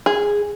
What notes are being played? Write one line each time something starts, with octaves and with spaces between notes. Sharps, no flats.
G#4